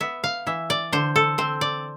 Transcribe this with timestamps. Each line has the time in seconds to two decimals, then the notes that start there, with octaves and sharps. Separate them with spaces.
0.01 B3 E5
0.24 F5
0.47 E3 E5
0.70 D5
0.92 D3 C5
1.16 A4
1.38 C4 C5
1.61 D5